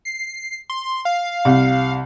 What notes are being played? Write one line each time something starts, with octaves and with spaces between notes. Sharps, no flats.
C7
C6
F5
C2